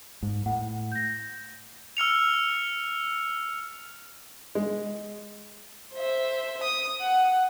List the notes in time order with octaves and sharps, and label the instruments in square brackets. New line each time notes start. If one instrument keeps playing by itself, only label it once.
[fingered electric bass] G#2
[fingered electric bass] A2 [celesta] F#5
[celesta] G6 A#6
[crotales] E6 F6 C#7 F7
[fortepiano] G#3
[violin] C5 E5
D#6
F#5